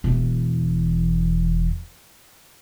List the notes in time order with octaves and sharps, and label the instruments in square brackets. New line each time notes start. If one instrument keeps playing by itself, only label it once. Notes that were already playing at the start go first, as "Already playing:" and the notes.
[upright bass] E1 E3